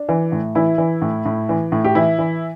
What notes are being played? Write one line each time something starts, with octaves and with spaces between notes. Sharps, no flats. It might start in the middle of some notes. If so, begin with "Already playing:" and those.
Already playing: D4
E3
A2
E3 E4
E3
A2
A2
E3
A2
G4
E3 E4
E3